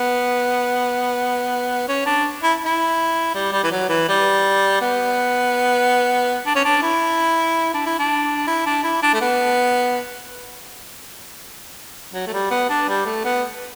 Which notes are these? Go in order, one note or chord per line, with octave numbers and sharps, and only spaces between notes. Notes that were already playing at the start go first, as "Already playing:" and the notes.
Already playing: B3
C#4
D4
E4
E4
G3
G3
E3
F#3
E3
G3
B3
D4
C#4
D4
E4
D4
E4
D4
E4
D4
E4
D4
A3
B3
F#3
A3
G3
B3
D4
G3
A3
B3